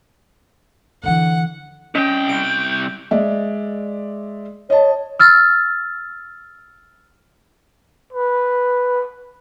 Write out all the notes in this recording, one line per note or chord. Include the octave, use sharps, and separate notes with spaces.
D3 E3 F#5
C2 C#4 D#5 G5
D7
G#3 D5 E5
C#5 D#5 A5
E6 F6 A6
B4